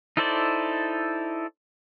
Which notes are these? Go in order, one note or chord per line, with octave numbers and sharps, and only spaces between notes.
D#4 E4 A4 C5 D5